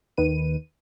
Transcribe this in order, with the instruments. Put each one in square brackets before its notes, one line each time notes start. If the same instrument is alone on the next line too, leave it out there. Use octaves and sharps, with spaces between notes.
[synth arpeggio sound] D#2 D#3 B4 D#7